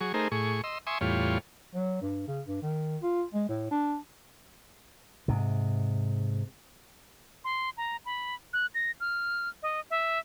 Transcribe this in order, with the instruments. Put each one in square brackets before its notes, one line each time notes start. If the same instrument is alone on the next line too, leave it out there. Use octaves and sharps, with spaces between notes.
[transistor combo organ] F#3 G#4 C#6
A3 D#4 G#4 A#4 C5
A2 G#4 C#6
D#5 C6 E6
E5 G#5 C6 C#6 D#6
E2 A2 G3 F4 C#5
[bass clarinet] F#3
G2
C#3
G2
D#3
F4
G#3
A2
D4
[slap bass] G#2 C3
[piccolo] C6
A#5
B5
F#6
A#6
F6
D#5
E5